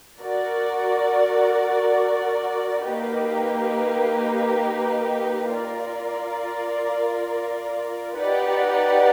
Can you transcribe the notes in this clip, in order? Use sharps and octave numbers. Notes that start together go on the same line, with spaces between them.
F#4 A#4 D5
A#3 D#4 G4 B4
F4 A#4 D5
D#4 G4 B4 D5 F#5